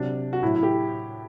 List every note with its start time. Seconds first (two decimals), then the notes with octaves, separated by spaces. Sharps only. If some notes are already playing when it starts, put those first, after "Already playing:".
Already playing: C3 F#3 D4
0.33 F#4
0.42 A2 F#3 E4
0.56 E4
0.63 G4